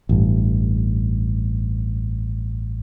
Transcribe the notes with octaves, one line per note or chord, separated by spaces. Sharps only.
A1 G2